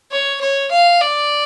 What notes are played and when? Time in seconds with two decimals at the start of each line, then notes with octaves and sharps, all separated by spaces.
0.11 C#5
0.41 C#5
0.71 F5
1.01 D5